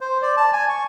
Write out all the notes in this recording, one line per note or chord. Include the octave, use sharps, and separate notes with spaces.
C5
D5
A5
G#5
C#6